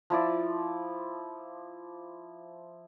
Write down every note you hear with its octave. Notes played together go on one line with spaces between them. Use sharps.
F3 E4 D5